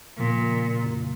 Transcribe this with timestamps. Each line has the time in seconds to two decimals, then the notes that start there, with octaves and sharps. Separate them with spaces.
0.18 A#2 C#3 F3 A#3
0.82 F2 C#3 A#3 F4